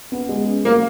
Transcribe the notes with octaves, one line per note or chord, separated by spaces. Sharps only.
B3
G#3
C#4
F#3 A#3